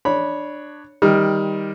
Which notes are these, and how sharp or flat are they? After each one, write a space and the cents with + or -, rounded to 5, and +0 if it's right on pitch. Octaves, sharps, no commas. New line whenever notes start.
D4 +15 C#5 +0 B5 -10
D#3 +15 G3 +15